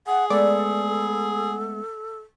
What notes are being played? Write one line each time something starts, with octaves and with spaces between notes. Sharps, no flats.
G#4 F#5
G#3 A3 B3 A4 D5